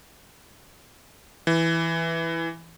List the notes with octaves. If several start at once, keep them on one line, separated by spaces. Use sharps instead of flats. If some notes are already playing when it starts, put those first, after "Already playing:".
E3